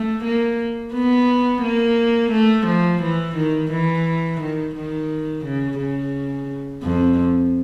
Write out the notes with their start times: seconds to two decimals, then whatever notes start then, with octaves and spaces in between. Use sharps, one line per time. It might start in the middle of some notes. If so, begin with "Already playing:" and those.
Already playing: A3
0.24 A#3
0.93 B3
1.62 A#3
2.32 A3
2.67 F3
3.02 E3
3.36 D#3
3.71 E3
4.41 D#3
4.75 D#3
5.45 C#3
5.79 C#3
6.84 F2